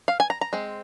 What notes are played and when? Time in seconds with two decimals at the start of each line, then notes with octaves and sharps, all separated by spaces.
0.08 F5
0.20 G#5
0.30 A#5
0.41 A#5
0.53 G#3 C4